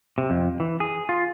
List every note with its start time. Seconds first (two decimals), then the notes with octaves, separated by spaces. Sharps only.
0.18 C3
0.30 F2
0.60 E3
0.80 G#4
1.09 F4